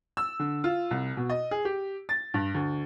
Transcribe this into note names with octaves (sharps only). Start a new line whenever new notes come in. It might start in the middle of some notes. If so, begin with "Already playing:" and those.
E6
D3
F4
C2
B2
D#5
G#4
G4
A6
G2
D2